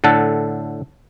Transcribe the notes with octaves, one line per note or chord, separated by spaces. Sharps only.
A2 D3 A4 F#5 A5